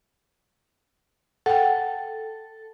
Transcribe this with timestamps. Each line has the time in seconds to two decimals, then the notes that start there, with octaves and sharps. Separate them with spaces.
1.46 A4 F#5 G5